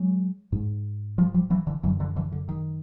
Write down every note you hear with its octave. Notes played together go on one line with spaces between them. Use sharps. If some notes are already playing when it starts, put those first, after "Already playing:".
Already playing: F#3 G#3
G#2
F3 G3
F3 G3
E3 F#3
D3 E3
F#2 D3 E3 F#3
D3 E3
D3 E3
D3
D#3